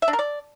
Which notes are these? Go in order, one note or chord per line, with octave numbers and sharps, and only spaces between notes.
E5
D4
A#4
D5